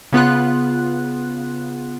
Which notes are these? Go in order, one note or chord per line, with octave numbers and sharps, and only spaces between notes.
C#3 B3 F4 F#6